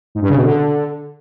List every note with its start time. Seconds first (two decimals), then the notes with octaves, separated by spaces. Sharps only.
0.15 G#2
0.22 G2
0.29 C#3
0.37 B2
0.44 D3